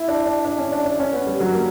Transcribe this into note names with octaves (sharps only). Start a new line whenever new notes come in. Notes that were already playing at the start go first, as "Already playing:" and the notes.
Already playing: E4
D4
D4
D4
C#4
D4
D4
C#4
B3
G3
F#3
A#3